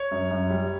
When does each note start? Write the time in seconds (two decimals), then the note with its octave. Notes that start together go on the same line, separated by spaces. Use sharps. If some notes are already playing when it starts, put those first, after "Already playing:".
Already playing: C#5
0.11 F#2
0.31 F#2
0.50 G3